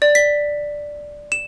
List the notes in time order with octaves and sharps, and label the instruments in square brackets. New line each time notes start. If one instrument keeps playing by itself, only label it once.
[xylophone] D5
B6
E7